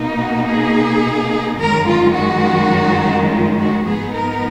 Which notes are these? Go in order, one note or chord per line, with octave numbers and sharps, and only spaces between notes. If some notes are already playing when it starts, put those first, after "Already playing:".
Already playing: B2 A#3 D#4
F#4
G#4
F#2 D#3 G#3 A#4
F4
F#4
F4
F#4
G#2 F3 B3 D#4 G#4
A#4